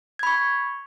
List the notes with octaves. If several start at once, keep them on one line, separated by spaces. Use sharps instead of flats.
B5 C#6 G#6